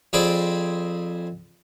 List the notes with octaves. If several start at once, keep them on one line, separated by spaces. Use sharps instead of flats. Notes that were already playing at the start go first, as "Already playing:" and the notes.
F2 C4 G#4 D5 B5